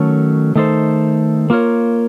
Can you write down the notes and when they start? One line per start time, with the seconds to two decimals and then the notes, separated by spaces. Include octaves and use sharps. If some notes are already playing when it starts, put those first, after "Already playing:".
Already playing: D#3 F#3 A3 C#4 A4
0.55 D#3 A3 D#4 A4 C5
1.50 A#3 F4 A#4 C#5